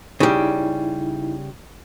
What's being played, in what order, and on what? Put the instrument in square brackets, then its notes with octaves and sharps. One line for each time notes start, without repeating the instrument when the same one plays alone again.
[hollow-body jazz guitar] C#3 G3 [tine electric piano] D#4 E4